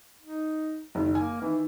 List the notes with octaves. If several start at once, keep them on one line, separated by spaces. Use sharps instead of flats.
D#4
F#1 D#3
A#3 G#5
D#3 E3